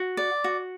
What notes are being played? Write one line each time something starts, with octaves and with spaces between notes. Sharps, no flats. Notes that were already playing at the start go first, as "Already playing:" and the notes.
Already playing: F#4
D5
F#4